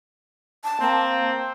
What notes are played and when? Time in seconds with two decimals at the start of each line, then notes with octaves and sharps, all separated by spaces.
0.64 A5
0.81 A#3 C4